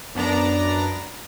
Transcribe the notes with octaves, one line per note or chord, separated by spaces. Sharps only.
F#2 B3 D4 D5 A#5